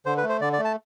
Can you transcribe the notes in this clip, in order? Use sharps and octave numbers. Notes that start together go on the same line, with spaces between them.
D3 C5
B4
A3
C5
D3 D5
D5
A3
A5